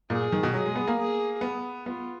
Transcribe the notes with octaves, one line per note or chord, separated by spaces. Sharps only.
A#2 G#4
D#3
B2
F#3 G#4
G#3
B3
A#3
G#4
B3
B3 F4